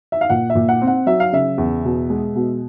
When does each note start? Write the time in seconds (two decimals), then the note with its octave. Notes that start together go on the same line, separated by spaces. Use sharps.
0.12 E5
0.21 F5
0.30 A#2 F#5
0.50 E5
0.55 A#2
0.69 F#5
0.82 C4
0.87 F#5
1.06 F#3 E5
1.20 F5
1.33 C#3 E5
1.58 E2
1.84 B2
2.10 G#3
2.36 B2